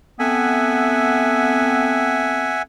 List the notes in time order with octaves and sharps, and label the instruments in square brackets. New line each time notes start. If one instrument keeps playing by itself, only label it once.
[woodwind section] A3 B3 C4 [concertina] E5 F#5 G#5